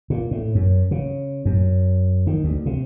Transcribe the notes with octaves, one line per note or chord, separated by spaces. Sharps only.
A#2
A2
F#2
C#3
F#2
D#3
D2
C3